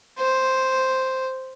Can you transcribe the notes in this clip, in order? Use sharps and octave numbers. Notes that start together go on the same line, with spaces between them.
C5